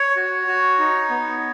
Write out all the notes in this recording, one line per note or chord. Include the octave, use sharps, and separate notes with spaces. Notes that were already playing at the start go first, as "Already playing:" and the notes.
Already playing: C#5
F#4
F#4
D#4
B3